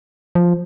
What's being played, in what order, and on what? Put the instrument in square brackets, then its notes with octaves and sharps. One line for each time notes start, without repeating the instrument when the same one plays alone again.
[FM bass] F3